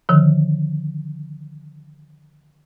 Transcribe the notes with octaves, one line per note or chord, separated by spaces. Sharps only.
D3 D#3 F3